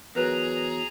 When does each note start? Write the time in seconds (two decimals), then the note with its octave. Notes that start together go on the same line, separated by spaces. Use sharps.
0.15 E2 F#3 G#4 A#4 B4 A#5 F#6